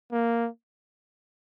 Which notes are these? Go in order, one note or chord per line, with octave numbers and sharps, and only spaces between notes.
A#3